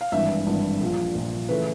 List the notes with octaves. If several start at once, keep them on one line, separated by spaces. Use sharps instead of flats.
F5
G#1 G2 E3 E5
G#1 G2 E3
A#1 A#2 F3
A#1 A#2 F3
C#3 E3 A3 B4